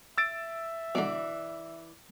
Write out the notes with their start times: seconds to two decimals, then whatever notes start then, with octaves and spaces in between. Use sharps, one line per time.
0.18 E5 E6 A6 D7
0.95 B2 D3 E3 D5